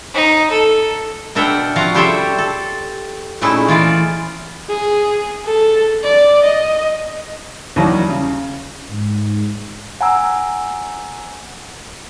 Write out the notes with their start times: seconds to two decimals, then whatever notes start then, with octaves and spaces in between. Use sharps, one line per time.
0.14 D#4
0.50 A4
1.35 B2 D4 A#4 E5 F#5 G5
1.76 C3 F3 F#4 F5 A#5
1.94 G3 G4 A4 C5 C#5 E5
2.38 A4
3.41 A#2 A3 C#4 D#4 E4 G#4
3.68 E3 F4 D5
4.69 G#4
5.45 A4
6.04 D5
6.44 D#5
7.76 D#2 E3 F#3 G3
8.10 C#3
8.87 G#2
10.01 F#5 G#5 A#5 E6